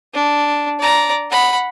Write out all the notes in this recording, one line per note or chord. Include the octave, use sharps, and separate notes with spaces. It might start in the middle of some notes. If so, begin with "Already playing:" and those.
D4
D5 A#5
F#5 B5